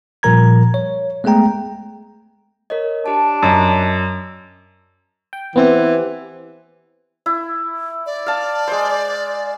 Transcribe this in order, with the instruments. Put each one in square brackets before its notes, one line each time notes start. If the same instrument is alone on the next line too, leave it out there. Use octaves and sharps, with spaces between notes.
[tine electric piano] A#2 F3 G3 A#4 A#5 G#6
C#5
G#3 A3 B3 G#4 G5 A#5
[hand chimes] A#4 C#5 D#5
[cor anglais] D4 [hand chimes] G4 A5
[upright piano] F#2 [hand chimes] D#5
[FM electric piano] G5
[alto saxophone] E3 [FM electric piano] B3 C4 G4
[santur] E4
[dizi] D5
[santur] F5 A5
G#3 C5